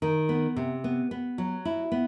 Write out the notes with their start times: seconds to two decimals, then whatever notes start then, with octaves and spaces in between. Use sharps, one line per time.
0.02 D#3
0.29 B3
0.56 C3
0.84 B3
1.11 B3
1.38 F#3
1.65 E4
1.92 B3